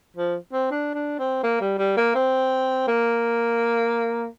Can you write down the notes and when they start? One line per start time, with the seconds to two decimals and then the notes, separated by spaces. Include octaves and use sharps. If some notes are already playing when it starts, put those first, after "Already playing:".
0.17 F3
0.53 C4
0.71 D4
0.94 D4
1.19 C4
1.43 A#3
1.61 G3
1.79 G3
1.97 A#3
2.15 C4
2.87 A#3